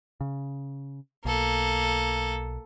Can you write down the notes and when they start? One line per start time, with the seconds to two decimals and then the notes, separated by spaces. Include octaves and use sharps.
0.21 C#3
1.25 B1 A#3 A4